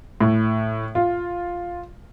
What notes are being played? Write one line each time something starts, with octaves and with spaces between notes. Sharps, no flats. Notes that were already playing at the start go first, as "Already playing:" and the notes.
A2
F4